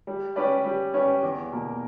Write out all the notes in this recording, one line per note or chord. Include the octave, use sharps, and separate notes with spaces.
G3
C#4 G4 B4 D5
G3
C#4 G4 B4 D5
E2
B2 A#3